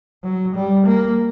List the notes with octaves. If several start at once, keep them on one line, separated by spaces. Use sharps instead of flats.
F#3
G3
A#3